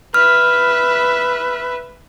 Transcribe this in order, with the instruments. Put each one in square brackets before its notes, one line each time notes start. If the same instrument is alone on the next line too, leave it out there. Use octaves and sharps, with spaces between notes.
[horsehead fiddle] B4 E5 [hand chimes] F6